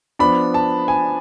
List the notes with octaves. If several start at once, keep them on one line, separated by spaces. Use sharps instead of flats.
F3 B3 D4 B5
A5
G#5